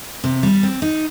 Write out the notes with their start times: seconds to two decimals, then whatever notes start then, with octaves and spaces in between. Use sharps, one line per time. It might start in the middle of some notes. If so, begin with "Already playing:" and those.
0.24 C3
0.43 G3
0.63 C4
0.82 D#4